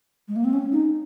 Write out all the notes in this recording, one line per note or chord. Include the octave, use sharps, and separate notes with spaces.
G#3
A#3
C4
C#4
D#4